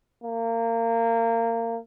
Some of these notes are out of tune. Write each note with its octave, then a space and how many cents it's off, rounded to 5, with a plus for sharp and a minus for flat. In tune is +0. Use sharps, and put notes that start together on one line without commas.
A#3 -25